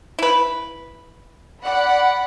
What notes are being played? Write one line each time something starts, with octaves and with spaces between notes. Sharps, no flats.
E4 B4
D5 F#5 B5